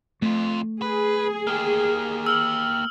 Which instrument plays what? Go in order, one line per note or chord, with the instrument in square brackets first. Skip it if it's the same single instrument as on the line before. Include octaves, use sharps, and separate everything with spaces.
[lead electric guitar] F2 F4 [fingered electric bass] A3
[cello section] G#4 [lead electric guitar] B4
[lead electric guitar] A#3 G4 [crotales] F6
[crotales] E6 F6 F#7